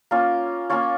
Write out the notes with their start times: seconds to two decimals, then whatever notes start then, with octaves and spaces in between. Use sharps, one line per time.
0.11 A#3 C#4 F4
0.70 A#3 C#4 F4 C#5